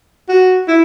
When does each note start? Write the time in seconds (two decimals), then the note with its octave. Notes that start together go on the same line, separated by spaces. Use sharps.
0.28 F#4
0.68 E4